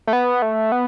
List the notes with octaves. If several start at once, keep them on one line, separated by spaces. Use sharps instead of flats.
A3
B3
A3
B3